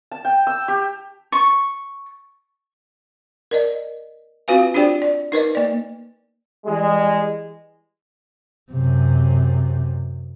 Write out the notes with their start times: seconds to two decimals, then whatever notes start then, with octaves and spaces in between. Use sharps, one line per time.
0.11 A5
0.25 G5
0.47 E6
0.68 G4
1.32 C#6
3.51 A#4 D5 D#5
4.48 C4 F4 F#4 B4 F5 G#5
4.74 D4 F4 G4 C5 D5 G5
5.02 D5
5.32 D#4 A#4 B4 D#5
5.55 A#3 D5
6.65 E3 G3 G#3
8.72 F#2 C3